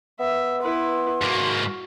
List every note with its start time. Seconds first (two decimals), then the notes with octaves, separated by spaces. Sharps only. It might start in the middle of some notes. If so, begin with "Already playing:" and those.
0.20 B3 E5
0.61 E4 B4 C6
1.22 G#2 A#3 F#4